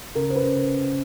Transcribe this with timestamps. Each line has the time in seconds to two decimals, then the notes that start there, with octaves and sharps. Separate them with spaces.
0.15 C#3 A#4
0.30 C5
0.36 B4
0.42 C#3